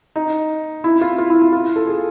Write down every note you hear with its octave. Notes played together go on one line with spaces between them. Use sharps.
D#4
E4
F4
F4
E4
E4
F4
A4
G#4